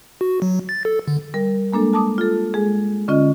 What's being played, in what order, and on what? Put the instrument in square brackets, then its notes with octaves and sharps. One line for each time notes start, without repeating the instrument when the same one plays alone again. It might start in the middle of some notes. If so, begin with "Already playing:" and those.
[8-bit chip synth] F#4
F#3
A6
A4
D3
[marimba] G3 A#4
G#3 A#3 D4 A4
A5 D6 D#6
F4 A4
G#3 G#4
D3 C#4 F4 D#5